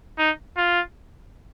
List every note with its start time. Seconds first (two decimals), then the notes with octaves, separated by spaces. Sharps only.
0.19 D#4
0.57 F4